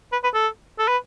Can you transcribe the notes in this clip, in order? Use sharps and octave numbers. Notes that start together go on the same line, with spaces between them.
B4
B4
A4
A4
B4